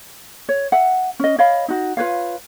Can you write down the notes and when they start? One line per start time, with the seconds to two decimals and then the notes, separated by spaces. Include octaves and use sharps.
0.49 C#5
0.72 E5 F#5
1.20 C#4 D#5
1.39 C#5 D#5 F5 B5
1.68 D#4 F#4
1.97 F4 B4 C#5 F5